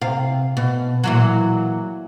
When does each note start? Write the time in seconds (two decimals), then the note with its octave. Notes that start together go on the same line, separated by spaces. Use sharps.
0.01 C3 F5
0.57 B2
1.04 A#2 E3 F#3